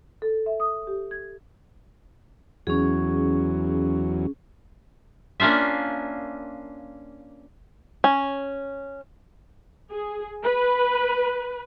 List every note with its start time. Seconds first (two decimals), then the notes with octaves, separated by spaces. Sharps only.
0.22 A4
0.46 E5
0.60 D#6
0.87 G4
1.11 G#6
2.67 E2 F#3 C#4 G#4
5.40 A#3 C#4 D4 F4 E5
8.04 C#4
9.91 G#4
10.44 B4